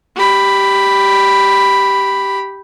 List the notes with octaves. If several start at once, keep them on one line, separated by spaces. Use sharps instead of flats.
G4 B5